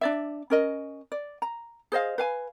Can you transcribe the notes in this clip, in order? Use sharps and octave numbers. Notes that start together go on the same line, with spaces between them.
D4 D5 E5
C#4 A#4 D#5
D5
A#5
G#4 C5 D#5 F5
B4 F5 G#5